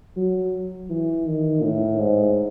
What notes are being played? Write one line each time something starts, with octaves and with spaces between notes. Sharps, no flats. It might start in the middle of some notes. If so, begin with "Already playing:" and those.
F#3
E3
D#3
A2
G#2